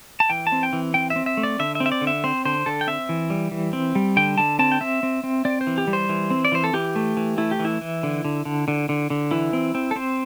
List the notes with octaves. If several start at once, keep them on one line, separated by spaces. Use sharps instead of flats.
A5
E3 G5
A5
C4
G5
E3
C4 G5
E5
C4
E5
A3
D5
D3 E5
E5
C4
E5
D5
D3
E5
C4 C5
D3 C5
D3 A4
G5
C4 E5
E3
G3
E3
C4
G3
D3 G5
D3 A5
C4 A5
G5
C4 E5
C4
C4
C4 D5
C5
E3
G4
G3
C5
E3
C4
D5
E3 C5
A4
E3 G4
A3
E3
A3 E4
G4
E3
E4
E3
D3
D3
D3
D3
D3
D3
E3 E4
C4
C4
A4
C4 C5